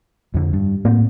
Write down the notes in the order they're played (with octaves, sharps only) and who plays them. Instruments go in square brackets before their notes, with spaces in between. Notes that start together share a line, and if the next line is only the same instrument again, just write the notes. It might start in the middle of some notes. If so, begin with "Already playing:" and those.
[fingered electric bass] F2 D3
G2
[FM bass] A2 [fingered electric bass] A#3 C4